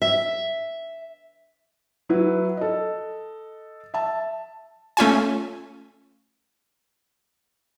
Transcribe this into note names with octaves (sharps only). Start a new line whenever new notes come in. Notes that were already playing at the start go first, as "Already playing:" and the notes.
E5
F#3 E4 B4
A4 D#5
E5 A5
A3 C#4 F4 G#5